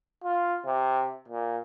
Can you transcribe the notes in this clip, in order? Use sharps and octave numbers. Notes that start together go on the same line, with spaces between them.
F4
C3
A#2